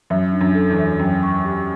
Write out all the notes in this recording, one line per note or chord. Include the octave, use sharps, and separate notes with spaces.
F#2 E5
D4
F#2
A4
E2
E5
F#2 G5
C#6
G4